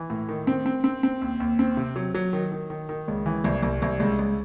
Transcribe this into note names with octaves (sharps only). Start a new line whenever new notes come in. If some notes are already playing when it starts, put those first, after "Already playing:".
Already playing: E3
A2
D#3
C4
C4
C4
C4
D#2
D#2
C4
C3
F#3
F#3
D#3
D#3
D#3
D#3
C#2
E3
C2
C2
C2
C#2
C#2